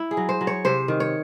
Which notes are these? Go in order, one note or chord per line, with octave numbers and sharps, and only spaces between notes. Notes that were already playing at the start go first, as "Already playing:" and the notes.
Already playing: E4
G#4
F#3
C5
F#3
C#5
C3 C5
D#3
C#5